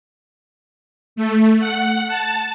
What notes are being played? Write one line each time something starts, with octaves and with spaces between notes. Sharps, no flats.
A3
F#5
A5